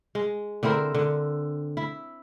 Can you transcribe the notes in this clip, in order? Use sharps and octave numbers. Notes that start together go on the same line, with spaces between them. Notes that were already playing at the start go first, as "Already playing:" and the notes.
G#3
D3 C4 E4 A#4
D3
E4